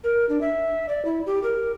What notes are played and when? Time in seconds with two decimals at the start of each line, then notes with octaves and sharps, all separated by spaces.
0.04 A#4
0.29 D4
0.41 E5
0.89 D5
1.05 E4
1.26 G4
1.43 A#4